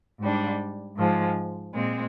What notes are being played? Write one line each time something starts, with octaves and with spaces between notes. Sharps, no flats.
G#2 G3 D4
G#2 F3 G#3
A#2 G#3 C4